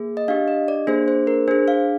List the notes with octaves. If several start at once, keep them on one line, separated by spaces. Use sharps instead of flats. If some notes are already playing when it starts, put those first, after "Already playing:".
Already playing: A#3 G#4
D#5
D4 G4 F5
D#5
D5
A#3 D4 G#4 C5
C5
A#4
D4 G#4 C5
F5